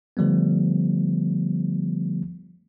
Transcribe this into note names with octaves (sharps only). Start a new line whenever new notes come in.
D3 F3 G3 A3 B3